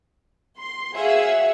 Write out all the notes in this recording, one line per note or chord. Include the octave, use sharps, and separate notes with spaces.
C6
F#4 G#4 C#5 E5 F5